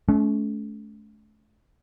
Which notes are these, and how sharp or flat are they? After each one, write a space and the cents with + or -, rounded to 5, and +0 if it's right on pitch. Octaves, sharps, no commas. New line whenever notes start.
A3 -40 C#4 +30